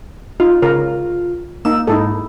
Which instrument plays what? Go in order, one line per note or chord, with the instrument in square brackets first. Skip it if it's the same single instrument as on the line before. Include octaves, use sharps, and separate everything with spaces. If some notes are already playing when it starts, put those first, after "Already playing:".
[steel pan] D#4 [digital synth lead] F4
[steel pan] C#3 A#4 [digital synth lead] F4
[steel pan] A#3 D#4 [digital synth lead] E6
[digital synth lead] G#2 [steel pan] D#4 E4 A4